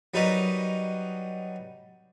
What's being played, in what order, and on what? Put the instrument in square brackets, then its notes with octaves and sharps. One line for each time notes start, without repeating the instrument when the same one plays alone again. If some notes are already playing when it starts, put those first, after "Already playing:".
[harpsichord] F#3 G3 D#4 A#4 B4 D#5